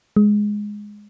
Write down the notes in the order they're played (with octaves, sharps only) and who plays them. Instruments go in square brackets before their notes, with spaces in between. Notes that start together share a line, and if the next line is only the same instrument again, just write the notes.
[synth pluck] G#3